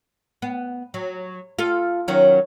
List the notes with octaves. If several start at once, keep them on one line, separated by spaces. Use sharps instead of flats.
B3
F#3
F4 A4
D#3 F#3 C#4